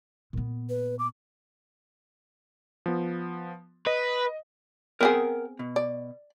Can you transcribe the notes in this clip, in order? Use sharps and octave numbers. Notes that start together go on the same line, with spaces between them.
A#2 B3
B4
D6
F3 B3
B4 D#5
B3 C4 G#4 A#4 F#5 G5
B2
D5